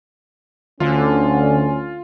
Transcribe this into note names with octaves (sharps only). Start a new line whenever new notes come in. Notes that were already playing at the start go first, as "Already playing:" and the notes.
D2 D3 C#4 F4